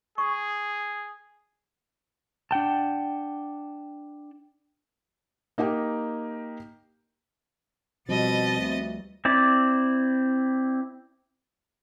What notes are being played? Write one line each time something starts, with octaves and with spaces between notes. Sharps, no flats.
G#4 C#6
D4 F#5 G5 A5
A#3 D#4 G4 G5
B2 F3 G3 B3 C4 D#5 A6
D2
C4 E4 D5